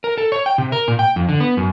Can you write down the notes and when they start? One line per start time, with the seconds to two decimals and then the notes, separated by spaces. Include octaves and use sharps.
0.04 A#4
0.18 A4
0.32 C#5
0.46 G5
0.58 C3
0.72 A#4
0.88 A#2
0.99 G5
1.16 F2
1.29 D3
1.40 B3
1.57 F#2